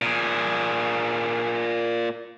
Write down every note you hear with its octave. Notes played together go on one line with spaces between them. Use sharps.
A#2 G#4